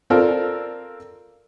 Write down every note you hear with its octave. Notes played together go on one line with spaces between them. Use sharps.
C4 F4 A4 A#4 D5